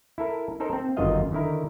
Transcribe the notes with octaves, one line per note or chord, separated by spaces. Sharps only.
E4 A4 A#4
D#4 A4 A#4 C5
C4
G1 F#2 D#3 F4 D#5 F5
D3 D#3 E4 A#4